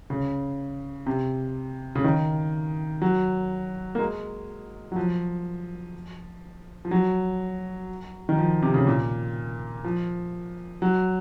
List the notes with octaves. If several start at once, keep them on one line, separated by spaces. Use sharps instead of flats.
C#3
C3
C#3
D#3
F#3
A#3
G#3
F#3
F3
F3
F#3
D#3
F3
C3
C#3
A#2
F3
F#3